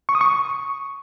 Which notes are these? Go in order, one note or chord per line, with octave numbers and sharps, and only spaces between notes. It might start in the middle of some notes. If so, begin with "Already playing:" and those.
C#6
D#6
C#6